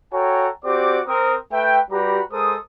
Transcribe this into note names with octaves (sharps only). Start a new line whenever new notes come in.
F#4 A4 C#5 G5 G#5 A#5
C4 F#4 G4 D5 D6
C4 A#4 D#6
A3 B4 E5 G5
G3 F#4 G4 B4 A#5 B5
G#3 A4 A#4 C5 D#6